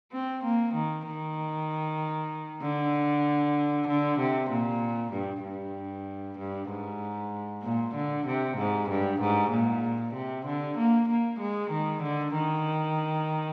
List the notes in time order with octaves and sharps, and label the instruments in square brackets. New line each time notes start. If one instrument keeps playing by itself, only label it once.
[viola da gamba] C4
A#3
D#3
D#3
D3
D3
C3
A#2
G2
G2
G2
G#2
A#2
D3
C3
G#2
G2
G#2
A#2
C3
D3
A#3
A#3
G#3
D#3
D3
D#3